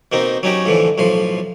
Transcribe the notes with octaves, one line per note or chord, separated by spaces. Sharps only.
B2 A#3 C4 D#4
F#3 C#4 D#4 G4
A2 D3 E3 F3
B1 A2 F3 C6